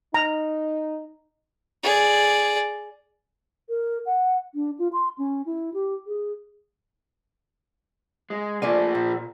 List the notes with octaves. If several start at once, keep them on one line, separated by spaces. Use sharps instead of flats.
D#4 A#5
G#4 D5
A#4
F#5
D4
F4
C6
C#4
E4
G4
G#4
G#3
F3 A3 A#3 D5 G#5
A#2